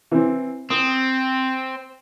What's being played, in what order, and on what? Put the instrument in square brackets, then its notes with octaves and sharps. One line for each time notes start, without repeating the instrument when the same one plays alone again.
[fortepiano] E3 C4
[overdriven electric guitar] C4 [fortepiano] D#6